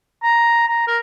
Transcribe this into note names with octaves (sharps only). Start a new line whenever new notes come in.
A#5
A#5
A#4